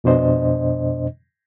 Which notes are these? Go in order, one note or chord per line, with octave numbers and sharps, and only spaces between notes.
F2 B2 D4 C5 D#5